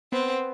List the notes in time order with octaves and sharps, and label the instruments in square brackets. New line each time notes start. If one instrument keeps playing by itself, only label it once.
[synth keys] B3 [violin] C4